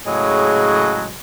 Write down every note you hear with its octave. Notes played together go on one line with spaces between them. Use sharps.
A2 C#3 F#3 G#3